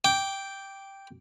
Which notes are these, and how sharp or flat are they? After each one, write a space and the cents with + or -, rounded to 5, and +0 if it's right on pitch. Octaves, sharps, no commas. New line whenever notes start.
G5 +0 D6 -10